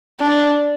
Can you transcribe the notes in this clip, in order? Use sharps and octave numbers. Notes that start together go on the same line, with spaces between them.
D4